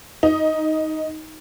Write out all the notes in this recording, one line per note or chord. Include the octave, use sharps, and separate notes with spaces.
D#4